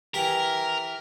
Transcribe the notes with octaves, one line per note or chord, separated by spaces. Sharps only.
E3 G4 A#4